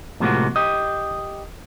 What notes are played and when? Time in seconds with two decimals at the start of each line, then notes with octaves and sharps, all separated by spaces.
0.20 A2 C3 F3 G#3 A#3 F#4
0.56 G4 D#5